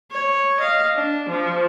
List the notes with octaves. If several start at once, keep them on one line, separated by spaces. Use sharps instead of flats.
C#5
D#5 F5
D4
F3